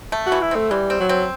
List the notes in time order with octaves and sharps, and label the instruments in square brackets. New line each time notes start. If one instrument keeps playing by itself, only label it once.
[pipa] A3
[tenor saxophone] F#4
[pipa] E3
[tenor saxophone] E4
[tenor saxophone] A3 [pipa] C4
[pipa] E3 [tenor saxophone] G3
[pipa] C4
[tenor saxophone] F#3
[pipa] C4